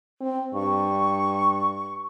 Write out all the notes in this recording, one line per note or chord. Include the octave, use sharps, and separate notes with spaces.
C4
G2 C#6